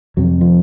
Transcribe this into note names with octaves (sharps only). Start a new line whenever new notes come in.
F2 C3 F#3
F3